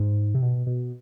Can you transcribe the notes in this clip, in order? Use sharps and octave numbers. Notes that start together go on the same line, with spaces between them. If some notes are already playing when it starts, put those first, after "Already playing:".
Already playing: G#2
C3
B2
B2